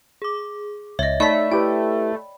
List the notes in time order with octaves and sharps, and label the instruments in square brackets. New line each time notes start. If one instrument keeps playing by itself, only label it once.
[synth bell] G#4 D6
[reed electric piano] C#2 A6 [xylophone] C#5 D#5 [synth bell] E5
[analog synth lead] A3 [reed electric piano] D#4 [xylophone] D5 B6 [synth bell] B5
[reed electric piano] E4 G4 B4 [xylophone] G5